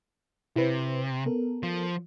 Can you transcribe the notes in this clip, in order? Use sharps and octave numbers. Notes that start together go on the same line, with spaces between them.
C3 E4 B4 C5
B3 A4 A#4
F3